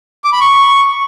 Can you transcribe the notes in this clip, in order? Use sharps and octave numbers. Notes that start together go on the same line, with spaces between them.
D6
B5
C#6